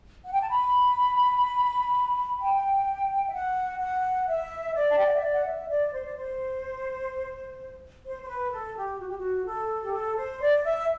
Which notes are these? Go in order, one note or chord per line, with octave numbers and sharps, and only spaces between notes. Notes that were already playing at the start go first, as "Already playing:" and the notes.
F#5
G5
A5
B5
G5
E5
F#5
F#5
E5
D5
A5
G5
F#5
E5
D5
F#5
E5
D5
C5
D5
C5
C5
C5
B4
A4
G4
F#4
G4
F#4
A4
G4
A4
C5
D5
E5